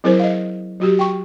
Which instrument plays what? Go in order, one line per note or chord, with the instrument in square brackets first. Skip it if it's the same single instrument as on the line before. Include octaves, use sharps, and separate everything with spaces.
[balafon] F#3 C4 E4 G#4 A#4 C5
D#5 F5
F#3 F#4 G4
G5 C#6